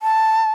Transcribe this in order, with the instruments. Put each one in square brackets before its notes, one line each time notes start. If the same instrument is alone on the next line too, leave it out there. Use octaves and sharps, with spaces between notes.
[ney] A5